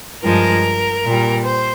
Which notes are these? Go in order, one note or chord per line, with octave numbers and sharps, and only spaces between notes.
G2 F3 G#3 A#4
A#2 G3
C5